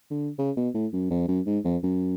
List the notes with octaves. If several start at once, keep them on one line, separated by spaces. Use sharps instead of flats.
D3
C#3
B2
A2
F#2
F2
F#2
G#2
F2
F#2